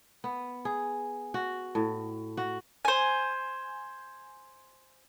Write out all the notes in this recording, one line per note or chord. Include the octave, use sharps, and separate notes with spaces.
B3
G#4
F#4
A2
F#4
C5 G#5